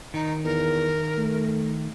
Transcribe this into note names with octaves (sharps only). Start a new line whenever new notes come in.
D#3 D#4
E2 A#4
A3